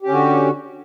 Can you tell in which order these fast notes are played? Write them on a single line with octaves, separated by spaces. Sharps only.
G4 C#4 D3 F#4